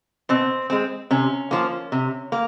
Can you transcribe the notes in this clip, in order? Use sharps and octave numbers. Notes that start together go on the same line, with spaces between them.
B2 C4
G#3 C4
C3 C#4
F3 A#3
C3
A#3